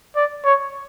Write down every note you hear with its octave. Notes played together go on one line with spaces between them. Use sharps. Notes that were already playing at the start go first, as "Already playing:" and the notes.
D5
C#5